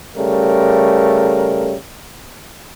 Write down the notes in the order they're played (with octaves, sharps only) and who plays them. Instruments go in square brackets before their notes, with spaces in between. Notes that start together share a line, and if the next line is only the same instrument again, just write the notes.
[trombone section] C#3 G3 A3 A#4